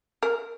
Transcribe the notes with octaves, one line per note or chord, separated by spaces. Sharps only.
A#4